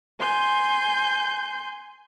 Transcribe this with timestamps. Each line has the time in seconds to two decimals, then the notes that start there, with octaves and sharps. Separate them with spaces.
0.20 G#5 C6 G6